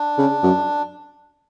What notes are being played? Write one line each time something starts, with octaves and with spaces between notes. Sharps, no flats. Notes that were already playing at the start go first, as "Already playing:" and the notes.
Already playing: D4
C#3
F#2